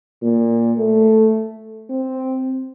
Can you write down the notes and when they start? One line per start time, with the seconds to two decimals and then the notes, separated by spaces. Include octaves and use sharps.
0.22 A#2
0.78 A3
1.90 C4